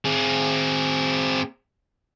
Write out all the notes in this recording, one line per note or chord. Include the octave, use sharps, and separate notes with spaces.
C4 G#4